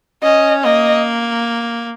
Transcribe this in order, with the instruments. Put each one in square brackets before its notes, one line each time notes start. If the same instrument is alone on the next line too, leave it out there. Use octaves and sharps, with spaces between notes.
[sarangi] C#4 [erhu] D#5
[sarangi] A#3 [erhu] D#5